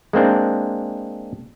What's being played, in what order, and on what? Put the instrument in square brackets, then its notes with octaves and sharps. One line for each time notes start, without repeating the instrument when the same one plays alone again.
[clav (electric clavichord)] G#3 A#3 C4 D4